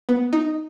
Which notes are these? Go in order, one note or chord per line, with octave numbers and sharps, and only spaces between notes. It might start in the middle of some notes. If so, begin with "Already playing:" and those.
B3
D#4